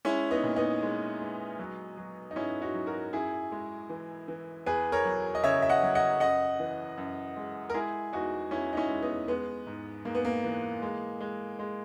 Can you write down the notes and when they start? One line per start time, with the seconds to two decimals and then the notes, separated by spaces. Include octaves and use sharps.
0.05 G#3 C#4 E4
0.31 B3 D#4
0.44 A#2
0.56 B3 D#4
0.82 G#3
1.21 G#3
1.59 F#3
1.97 F#3
2.31 D#4
2.36 G#2 C#4 E4
2.62 D#4 F#4
2.74 F#3
2.87 F#4 A#4
3.13 F#2 E4 G#4
3.52 G#3
3.89 E3
4.28 E3
4.66 E2 G#4 B4
4.92 A#4 C#5
5.05 F#3
5.35 D#5
5.43 C#3 C#5 E5
5.62 E5
5.69 D#5 F#5
5.82 F#3
5.95 D#5 F#5
6.20 F#2 D#5 F#5
6.59 E3
6.98 F#2
7.36 G#3
7.70 A#4
7.74 G#3 E4 G#4
8.13 E2 D#4 F#4
8.51 E2 C#4 E4
8.73 D#4
8.77 C#4 E4
8.90 G#3
9.02 B3 D#4
9.28 G#3 B3
9.67 G#2
10.05 G#2 A#3
10.15 B3
10.25 A#3
10.44 E3
10.82 G#3
11.21 G#3
11.59 G#3